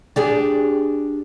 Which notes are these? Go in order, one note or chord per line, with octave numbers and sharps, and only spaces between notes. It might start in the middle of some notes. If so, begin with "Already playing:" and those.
D4 G4 G#4